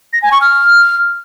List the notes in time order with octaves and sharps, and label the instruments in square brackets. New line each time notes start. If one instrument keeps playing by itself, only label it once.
[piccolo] A#6
G#5
C#6
F6